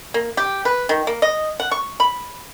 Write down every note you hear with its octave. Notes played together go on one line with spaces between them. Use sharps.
A#3
G4
B4
D#3
A#3
D#5
F#5
C#6
B5